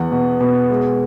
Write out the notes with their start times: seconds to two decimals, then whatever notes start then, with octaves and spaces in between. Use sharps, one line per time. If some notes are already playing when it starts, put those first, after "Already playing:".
Already playing: E2 F#5
0.12 B2
0.41 B2
0.70 G#3